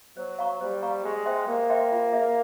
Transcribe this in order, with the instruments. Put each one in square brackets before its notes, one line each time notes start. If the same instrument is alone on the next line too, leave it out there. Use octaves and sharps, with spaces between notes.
[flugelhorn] F#3 [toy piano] C5
[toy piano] F5 A#5 C#6
[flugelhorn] G3 [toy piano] C5
[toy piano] F5 A#5 C#6
[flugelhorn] G#3 [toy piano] G4
[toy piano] C5 E5 G5 C6
[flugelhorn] A#3 [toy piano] G4
[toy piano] C5 E5 G5 C6
F4
G#4 C#5 E5